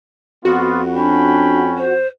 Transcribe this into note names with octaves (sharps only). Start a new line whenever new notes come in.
F2 B3 F4 F#4
C#4 D4 G5 B5
C5